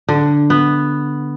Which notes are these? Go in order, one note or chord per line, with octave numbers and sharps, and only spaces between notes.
D3
B3